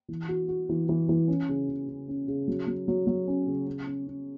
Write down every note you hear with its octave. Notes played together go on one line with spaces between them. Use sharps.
E3
F#4
F#4
E3
E3
E3
C#4
C#3
C#3
C#3
C#4
C#3
F#3
F#3
F#3
F#3
C#4
C#3
C#4
C#4
C#4